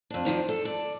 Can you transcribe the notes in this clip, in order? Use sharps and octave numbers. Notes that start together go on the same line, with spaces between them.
F2 D4
F#2 D#3 F3 D4
A4
D5